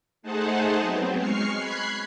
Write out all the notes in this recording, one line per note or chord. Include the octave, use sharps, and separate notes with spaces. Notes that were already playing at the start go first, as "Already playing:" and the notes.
A3 D#4 G#4 C5 F#5 A5
F#3 B3 C4
G#3 C#6 F6 C7
B5 F#6 G#6 C7